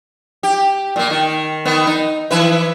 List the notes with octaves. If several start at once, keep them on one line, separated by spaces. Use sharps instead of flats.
G4
A#2 A#3
D#3
D#3 B3
D#4
E3 E4 B4